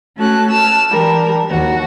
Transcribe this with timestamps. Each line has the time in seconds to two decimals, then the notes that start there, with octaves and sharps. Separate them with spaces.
0.16 A3 C#4 F#4 A5 F#6
0.48 A5 E6 F6
0.90 E3 G3 D4 A#4
1.49 D#2 F#4